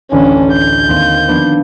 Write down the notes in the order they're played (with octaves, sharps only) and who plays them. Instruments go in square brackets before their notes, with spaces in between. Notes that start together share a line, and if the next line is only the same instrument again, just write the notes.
[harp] A1 D2 G#5 [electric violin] C#4 D4
[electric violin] G6
[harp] D#2 C4 C5
F3 B3 D4